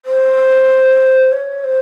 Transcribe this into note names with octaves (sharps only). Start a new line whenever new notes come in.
C5
C#5
C5